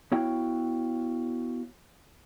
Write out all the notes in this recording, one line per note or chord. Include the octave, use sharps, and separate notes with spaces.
B3 E4 F#4 C#5 F5 G5